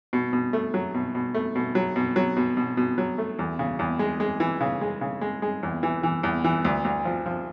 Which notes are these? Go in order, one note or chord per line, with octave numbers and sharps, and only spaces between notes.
B2
B2
A3
F#3
B2
B2
A3
B2
F#3
B2
F#3
B2
B2
B2
F#3
A3
E2
C#3
E2
G#3
G#3
E3
C#3
G#3
C#3
G#3
G#3
E2
E3
E3
E2
E3
D2
D2
F3
F3